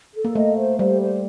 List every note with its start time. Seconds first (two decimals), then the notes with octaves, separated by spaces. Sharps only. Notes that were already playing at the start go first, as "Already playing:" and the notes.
0.14 A4
0.25 A#3
0.35 A3 D#5
0.58 C5
0.79 G3 C5
1.01 C5